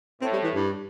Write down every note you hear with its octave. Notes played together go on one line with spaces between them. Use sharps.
A2 C4
G3
E3
G2